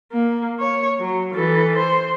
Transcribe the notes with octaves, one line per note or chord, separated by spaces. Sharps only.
A#3
C#5
F#3
E3 A4
C5